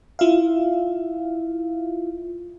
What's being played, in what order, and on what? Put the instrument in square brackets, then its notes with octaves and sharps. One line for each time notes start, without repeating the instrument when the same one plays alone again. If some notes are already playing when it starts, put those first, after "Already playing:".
[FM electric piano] E4 F4 E5 F5